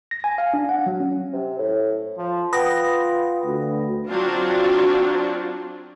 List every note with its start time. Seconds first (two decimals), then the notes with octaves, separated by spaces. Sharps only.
0.11 A#6
0.24 G#5
0.38 F5
0.54 D4
0.69 F#5
0.86 F#3
1.00 C#4
1.33 C3
1.58 A2
2.18 F3
2.53 F4 B4 F#5 G5 B5 D#6 A#6
3.45 D2
4.08 F#3 C4 D4 F4